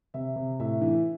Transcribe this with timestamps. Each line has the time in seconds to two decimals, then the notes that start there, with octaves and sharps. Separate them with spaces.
0.14 C3 E5
0.36 C3
0.60 A2 E5
0.81 E3